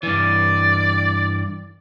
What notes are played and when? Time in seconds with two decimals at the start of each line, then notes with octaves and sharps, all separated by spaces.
0.03 G2 E3 D5